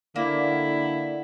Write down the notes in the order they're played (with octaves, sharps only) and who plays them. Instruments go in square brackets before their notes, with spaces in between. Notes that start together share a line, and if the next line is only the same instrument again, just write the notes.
[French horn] D3 [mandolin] A#3 [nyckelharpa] E4 [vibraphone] D5 F#5